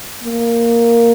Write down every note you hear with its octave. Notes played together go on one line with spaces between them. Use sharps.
A#3